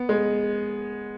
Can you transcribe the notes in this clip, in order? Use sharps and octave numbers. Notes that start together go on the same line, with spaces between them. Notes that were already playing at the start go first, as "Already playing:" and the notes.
Already playing: B3
G#3